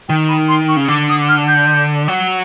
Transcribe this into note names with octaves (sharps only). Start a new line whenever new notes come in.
D#3 G5
B5
C6
C#6
C#3
D3 D6
D#6
F6
G6
F#3